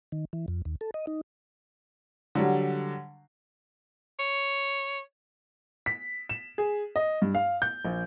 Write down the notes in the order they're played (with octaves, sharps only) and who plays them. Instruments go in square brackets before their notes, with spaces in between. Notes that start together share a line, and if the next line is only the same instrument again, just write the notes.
[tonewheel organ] D#3
E3
F2
D#2
A4
D#5
D#4
[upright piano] D3 F#3 G3
[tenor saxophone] C#5
[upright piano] B6
E7
G#4
D#5
G2
F5
G6
A#1